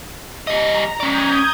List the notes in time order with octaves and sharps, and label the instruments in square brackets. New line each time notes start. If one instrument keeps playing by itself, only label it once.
[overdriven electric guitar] G3 D#5 [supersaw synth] A#5
[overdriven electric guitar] C#4 D5 [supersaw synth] D#6 G6 G#6